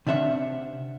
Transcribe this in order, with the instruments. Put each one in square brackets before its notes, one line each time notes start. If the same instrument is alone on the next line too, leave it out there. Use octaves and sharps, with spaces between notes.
[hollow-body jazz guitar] C3 D4 E5 F#5